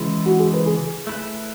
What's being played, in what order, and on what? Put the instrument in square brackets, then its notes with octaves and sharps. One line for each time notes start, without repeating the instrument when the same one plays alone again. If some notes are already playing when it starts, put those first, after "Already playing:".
Already playing: [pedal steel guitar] C#3 E3 G#3
[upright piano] F#4
G#4
B4
G#4
[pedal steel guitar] A3 E4 B4